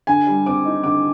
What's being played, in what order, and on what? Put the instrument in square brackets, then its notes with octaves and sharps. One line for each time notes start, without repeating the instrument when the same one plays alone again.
[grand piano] D3 [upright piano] G#5
[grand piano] G3
[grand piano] C4 [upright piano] D6
[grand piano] D#4
[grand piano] D3 [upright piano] D6